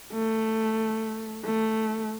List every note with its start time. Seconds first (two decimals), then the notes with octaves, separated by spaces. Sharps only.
0.13 A3
1.45 A3